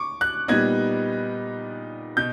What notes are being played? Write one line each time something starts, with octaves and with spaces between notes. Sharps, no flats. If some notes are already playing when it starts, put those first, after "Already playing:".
Already playing: C#6 D6
F#6
A#2 G3 B3 D#4 G#6
B2 G6